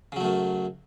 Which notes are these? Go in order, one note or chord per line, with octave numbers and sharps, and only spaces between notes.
F#2 C#3 F#3 A3